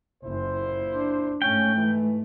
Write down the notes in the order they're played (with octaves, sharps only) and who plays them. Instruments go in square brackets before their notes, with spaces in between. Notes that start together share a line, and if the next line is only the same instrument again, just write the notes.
[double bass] F#1 [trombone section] A#2 E4 C5
[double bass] D4
[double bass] G#2 A3 [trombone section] C#4 [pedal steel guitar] G5
[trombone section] E3